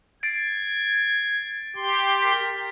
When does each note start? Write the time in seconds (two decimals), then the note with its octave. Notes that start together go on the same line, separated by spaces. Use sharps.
0.23 G#6 A6 C7 D7
1.76 G4 C6
2.22 A#4 B6